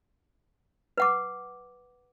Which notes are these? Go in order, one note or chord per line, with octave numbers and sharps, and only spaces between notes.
B4 F#5 D6